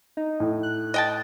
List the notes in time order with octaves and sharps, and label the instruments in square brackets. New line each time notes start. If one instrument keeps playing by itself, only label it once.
[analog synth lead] D#4
[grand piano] A2
[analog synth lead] F#6
[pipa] D#5 G5 A5